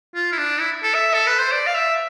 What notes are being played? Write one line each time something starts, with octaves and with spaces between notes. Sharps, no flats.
F4
E4
D4
E4
A4
E5
A4
B4
C5
D5
F5
E5